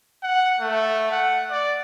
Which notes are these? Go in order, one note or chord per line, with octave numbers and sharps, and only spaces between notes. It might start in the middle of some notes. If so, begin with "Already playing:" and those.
F#5
A3
F#5
D5